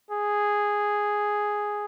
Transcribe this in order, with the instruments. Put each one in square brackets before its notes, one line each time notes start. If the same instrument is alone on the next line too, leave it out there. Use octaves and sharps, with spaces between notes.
[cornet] G#4